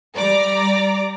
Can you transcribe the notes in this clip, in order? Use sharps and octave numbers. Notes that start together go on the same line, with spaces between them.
G3 D5 A#5 D6